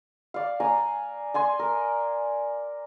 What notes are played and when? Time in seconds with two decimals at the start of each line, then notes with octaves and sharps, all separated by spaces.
0.34 D5 F5
0.60 D5 G#5 A#5
1.34 D5 G#5 C6
1.59 A#4